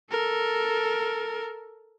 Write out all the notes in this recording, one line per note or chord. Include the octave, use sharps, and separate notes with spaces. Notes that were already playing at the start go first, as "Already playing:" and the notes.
A4 A#4